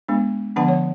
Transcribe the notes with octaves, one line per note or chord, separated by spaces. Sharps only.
G#3 B3 D4
D3 F3 B3 D4 F#5 A5
C#5